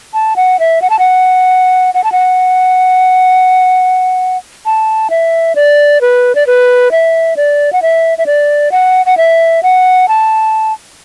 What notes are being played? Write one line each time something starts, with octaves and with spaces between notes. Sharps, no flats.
A5
F#5
E5
F#5
A5
F#5
F#5
A5
F#5
A5
E5
D5
B4
D5
B4
E5
D5
F#5
E5
E5
D5
F#5
F#5
E5
F#5
A5